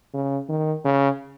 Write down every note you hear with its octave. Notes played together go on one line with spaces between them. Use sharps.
C#3
D#3
C#3